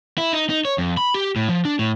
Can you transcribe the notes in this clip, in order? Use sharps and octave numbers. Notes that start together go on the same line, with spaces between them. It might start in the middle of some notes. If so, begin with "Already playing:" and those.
E4
D#4
D#4
C#5
F2
B5
G4
A2
F3
D4
A2